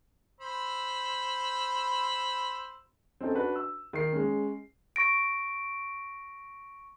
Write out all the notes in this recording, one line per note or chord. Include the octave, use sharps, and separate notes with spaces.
C5 B5 E6
C4 C#4 D#4 A4
D4 F#4 B4
E6
D#3 C7
G#3 C#4
C#6 A#6 D7